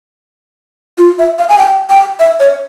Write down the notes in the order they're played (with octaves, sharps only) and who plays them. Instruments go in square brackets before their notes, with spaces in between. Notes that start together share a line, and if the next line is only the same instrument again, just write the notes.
[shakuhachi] F4
E5
F5
G#5
G5
G5
E5
C#5